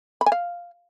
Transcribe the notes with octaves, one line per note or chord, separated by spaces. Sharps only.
B5
G#5
F5